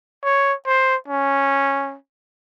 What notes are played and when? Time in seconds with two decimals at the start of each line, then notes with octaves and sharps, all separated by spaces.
0.24 C#5
0.66 C5
1.08 C#4